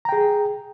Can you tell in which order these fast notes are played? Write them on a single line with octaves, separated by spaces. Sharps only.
A#5 G5 G#4